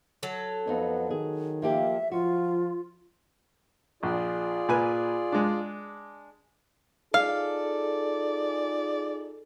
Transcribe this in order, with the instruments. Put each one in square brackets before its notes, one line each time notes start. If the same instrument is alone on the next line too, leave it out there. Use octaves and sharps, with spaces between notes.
[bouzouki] F#3 A4
[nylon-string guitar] F2 D#4 [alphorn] B3
[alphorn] D#3 [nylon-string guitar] G#4
[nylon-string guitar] F3 A#3 G4 [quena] E5
[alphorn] F3 [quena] F4 [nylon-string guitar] F#4
[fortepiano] A#1 [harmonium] F4 G#4 D5
[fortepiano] A#2 B4 G#5
G#3 D4
[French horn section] D#4 F4 G#4 [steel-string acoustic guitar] A4 [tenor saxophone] D5 [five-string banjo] F5